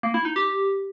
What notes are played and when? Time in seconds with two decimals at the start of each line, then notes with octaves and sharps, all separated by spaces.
0.03 A#3
0.14 E4
0.25 D#4
0.36 G4